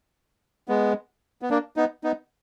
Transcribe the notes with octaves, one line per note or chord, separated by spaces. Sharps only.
G#3 B3
B3
A#3 D4
B3 D#4
B3 D#4